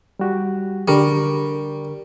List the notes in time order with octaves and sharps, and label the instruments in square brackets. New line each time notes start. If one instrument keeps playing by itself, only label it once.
[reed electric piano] G3 F#4 G4
[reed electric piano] D3 A#4 C#6 [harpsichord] G3